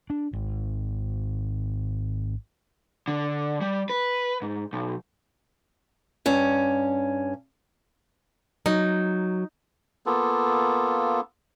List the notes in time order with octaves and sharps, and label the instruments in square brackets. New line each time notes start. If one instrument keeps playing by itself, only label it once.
[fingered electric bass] D4
G#1
[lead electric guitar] D3
G3
B4
G#2
B1
[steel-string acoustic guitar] G2 C#4
[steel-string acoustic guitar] F#3 [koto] D#4
[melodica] A#3 B3 F4 A4